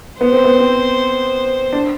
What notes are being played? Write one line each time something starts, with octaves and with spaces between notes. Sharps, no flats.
B3 C5
C4
B3
C4
D4